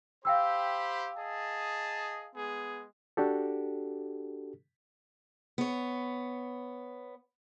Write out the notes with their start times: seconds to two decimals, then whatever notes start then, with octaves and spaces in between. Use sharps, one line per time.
0.25 G4 C5 F5 G5 B5 E6
1.18 G#4 D#5 A5
2.35 G#3 B3 G#4
3.17 D4 F#4 G4 A4
5.58 B3 C#5